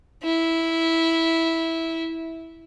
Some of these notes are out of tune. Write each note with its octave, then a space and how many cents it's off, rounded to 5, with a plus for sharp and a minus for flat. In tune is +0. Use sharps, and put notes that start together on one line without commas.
E4 -10